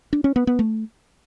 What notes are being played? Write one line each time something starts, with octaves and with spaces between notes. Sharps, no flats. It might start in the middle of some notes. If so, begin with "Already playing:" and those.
D4
C#4
B3
B3
A3